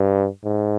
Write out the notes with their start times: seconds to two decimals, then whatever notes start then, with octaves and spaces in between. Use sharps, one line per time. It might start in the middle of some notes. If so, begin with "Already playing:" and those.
Already playing: G2
0.44 G#2